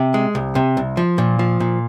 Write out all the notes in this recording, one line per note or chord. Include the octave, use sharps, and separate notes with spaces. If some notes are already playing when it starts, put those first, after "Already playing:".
Already playing: C3
G#3
C2
C3
C2
F3
A#2
F3
A#2